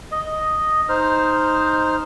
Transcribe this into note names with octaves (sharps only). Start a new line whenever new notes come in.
D#5
D#4 C5 F6